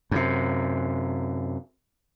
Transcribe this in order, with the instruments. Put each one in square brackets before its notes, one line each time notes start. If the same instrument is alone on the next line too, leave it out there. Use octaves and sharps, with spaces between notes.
[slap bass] F#2 C3